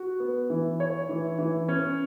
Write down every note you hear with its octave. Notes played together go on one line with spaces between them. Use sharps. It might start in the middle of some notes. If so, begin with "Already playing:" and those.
Already playing: F#4
B3
E3
C#5
E3
E3
C#4